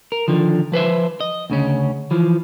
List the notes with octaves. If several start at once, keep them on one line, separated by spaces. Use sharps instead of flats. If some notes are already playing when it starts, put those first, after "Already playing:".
A#4
D3 D#3 F3
F3 B4 C5 E5
D#5
D2 C#3 C#4
E3 F3